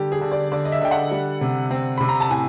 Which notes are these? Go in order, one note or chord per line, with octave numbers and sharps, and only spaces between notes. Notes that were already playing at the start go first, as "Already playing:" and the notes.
Already playing: D3 G3 G4
G#4
D3
D5
D3 D5
D#5
E5
D3 G5
F#5
G3
C3
C4
C3 B5
A#5
A5
A2 G#5